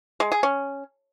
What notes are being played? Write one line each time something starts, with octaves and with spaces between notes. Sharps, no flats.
G#3
G#4
C#4